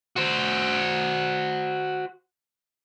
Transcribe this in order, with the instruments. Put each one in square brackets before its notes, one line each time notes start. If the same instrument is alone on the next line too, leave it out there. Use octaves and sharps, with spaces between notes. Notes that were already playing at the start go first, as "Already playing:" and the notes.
[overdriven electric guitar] F#4 C5